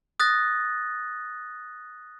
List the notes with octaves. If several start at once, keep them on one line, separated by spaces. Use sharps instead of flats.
D#6 F#6 A6 A#6